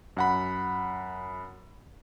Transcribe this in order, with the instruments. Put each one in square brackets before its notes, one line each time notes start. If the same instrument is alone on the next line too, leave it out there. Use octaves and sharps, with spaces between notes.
[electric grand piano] F#2 F#5 B5